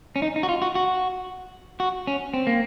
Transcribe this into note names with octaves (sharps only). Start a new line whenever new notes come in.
C#4
D#4
D#4
F#4
F4
F#4
F#4
F#4
C#4
C4
A#3